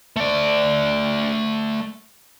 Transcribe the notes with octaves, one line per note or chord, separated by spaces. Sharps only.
A3 D5